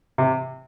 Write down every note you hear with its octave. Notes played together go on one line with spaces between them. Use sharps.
C3